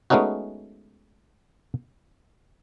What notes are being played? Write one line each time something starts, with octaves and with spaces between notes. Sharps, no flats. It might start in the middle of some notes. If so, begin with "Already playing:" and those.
G#3 A3 B3 C#4 D#4 F#4